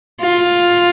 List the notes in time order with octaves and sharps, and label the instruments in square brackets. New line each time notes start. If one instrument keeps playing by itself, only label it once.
[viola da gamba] F4